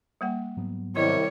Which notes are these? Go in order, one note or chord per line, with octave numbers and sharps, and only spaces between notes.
G3 A#3 F#5
G#2 F#3 B3
C2 D#3 G3 E4 C#5 D#5